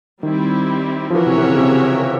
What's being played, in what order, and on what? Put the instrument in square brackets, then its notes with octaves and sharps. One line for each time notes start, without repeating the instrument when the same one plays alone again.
[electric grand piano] D#3 [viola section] G3 C4 E4
[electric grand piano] F3
[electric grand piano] E3 [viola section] C#4 F#4 A#4 C#5 E5
[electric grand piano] C3
C3
C#3
C3
C#3